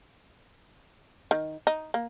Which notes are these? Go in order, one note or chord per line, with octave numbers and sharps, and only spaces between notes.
D#3
D#4
A#3